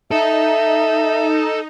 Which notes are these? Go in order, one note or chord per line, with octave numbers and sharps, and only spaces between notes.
D#4 A4 E5